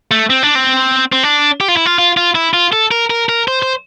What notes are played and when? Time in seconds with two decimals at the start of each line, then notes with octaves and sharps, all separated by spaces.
0.11 A3
0.30 C4
0.43 D4
0.55 C4
1.12 C4
1.23 D4
1.61 G4
1.68 F4
1.77 E4
1.86 F4
1.98 F4
2.17 F4
2.35 E4
2.54 F4
2.73 A4
2.91 A#4
3.10 A#4
3.29 A#4
3.48 C5
3.62 C5